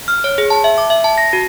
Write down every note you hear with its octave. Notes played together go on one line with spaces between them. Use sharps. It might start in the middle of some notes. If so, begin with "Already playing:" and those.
F6
C#5
G#4
A5
E5
D6
E5
A5
A#6
F#4